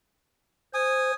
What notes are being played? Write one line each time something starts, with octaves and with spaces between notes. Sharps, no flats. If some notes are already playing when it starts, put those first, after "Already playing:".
C5 G#5 D#6